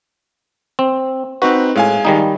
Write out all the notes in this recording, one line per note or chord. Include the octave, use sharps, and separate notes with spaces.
C4
C4 D#4 F#4 B4
A2 G#3 F5 G#5
D#3 G3 D#4